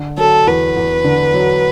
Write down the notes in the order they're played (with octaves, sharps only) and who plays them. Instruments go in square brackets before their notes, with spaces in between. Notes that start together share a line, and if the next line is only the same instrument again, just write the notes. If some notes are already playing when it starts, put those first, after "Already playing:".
Already playing: [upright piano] D3
[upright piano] F#3 [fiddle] A4
[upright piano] E2 [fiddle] B4
[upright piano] E2
D3
F#3